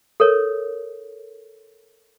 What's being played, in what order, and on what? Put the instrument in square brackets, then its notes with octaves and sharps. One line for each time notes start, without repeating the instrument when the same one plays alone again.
[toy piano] A4 A#4 C#5